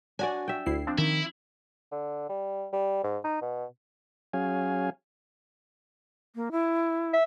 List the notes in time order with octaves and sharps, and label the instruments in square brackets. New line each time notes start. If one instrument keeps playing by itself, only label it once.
[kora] D4 F#4 D5 [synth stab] G#5
[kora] E5 G5
[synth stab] D2 E4 C7
F3 C4 D4
[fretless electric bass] D#3 [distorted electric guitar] E4
[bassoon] D3
G3
G3
G#2
D#4
B2
[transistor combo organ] F#3 C#4 G#4 F5 G#5
[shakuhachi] A#3
E4
[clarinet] E5